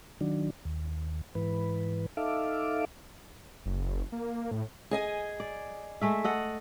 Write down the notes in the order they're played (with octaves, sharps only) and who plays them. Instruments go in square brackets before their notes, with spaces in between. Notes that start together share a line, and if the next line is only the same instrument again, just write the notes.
[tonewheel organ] D#3 F#3 D4
D#2
G#2 E3 B4
D#4 A4 E5 F5 D6
[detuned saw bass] F#1
A#3
A2
[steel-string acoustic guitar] G#4 D#5 G#5
[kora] D5
G#3 A3 E5
A4 D#5 F#5